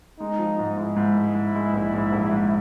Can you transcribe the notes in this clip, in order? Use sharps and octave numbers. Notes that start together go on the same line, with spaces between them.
G#3 D#4
F3
G#2
G#3 E4
G#2
G#3
G#2
G#3
A#1
G#2
A#1
G#2